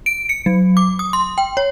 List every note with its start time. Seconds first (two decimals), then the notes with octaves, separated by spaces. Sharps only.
0.06 D7
0.29 C#7
0.46 F#3
0.77 D6
0.99 D#6
1.13 C6
1.38 G5
1.57 C#5